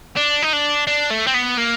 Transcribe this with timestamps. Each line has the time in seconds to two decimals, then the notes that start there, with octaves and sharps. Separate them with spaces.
0.16 D4
0.42 D#4
0.53 D4
0.87 D4
1.11 A3
1.27 C4
1.35 B3
1.58 A#3